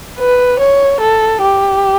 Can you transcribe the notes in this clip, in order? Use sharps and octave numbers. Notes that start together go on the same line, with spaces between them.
B4
C#5
A4
G4